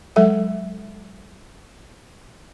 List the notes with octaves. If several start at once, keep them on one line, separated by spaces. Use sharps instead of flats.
F#3 G#3 A4 E5 F#5